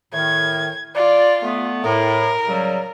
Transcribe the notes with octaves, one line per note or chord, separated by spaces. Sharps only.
A2 D#3 G#6
F4 D5
A3 B3
A2 A#4
C#3 F#3 G3